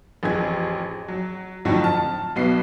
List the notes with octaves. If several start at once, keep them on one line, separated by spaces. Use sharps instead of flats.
A1 F2 G#4 G#6
F#3
F2 A2 D3 F3 F#3 D#4
A5 F6
B1 B3 C7